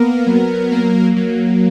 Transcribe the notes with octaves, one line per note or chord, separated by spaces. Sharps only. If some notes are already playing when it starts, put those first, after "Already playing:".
Already playing: A#3 B3 A#4
F#3
A#3
F#3